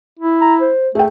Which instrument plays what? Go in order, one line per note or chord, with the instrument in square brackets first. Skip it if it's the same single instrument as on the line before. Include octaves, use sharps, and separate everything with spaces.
[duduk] E4
[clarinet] A#5
C5
[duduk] A3 [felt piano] G#4 G5